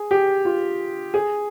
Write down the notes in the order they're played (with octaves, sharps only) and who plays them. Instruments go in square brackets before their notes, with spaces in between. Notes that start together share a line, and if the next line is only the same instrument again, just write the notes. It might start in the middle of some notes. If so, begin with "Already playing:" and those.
Already playing: [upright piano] G#4
G4
F4
G#4